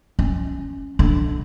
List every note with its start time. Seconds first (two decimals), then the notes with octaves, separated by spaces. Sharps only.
0.19 C#4
0.99 D3